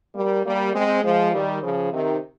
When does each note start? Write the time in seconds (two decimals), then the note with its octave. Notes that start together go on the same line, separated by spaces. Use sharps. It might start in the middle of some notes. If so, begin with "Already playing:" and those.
0.15 G3 A#3
0.44 G3 A#3
0.74 G#3 C4
1.03 F3 G#3
1.32 D#3 G3
1.62 C#3 F3
1.91 C3 D#3